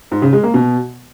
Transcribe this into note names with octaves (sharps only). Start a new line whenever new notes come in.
G#2
C#3
G#3
A#3
B2